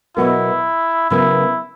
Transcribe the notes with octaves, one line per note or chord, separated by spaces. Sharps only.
B2 F#3 B3 E4 F#4 A#4
C#3 F#3 B3 E4 F#4 A#4